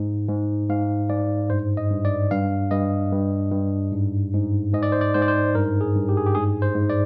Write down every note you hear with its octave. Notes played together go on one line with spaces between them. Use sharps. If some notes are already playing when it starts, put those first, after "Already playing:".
Already playing: G#2
G#2
G#2 F5
G#2 D5
G2 C5
D#5
G2
D5
G2 F5
G2 D#5
G2
G2
G#2
G#2
G#2 D#5
D5
C5
D5
G#2 C5
D5
C5
G2 A#4
G#4
G2
G4
G#4
G4
G#2 G#4
C5
G#2
D5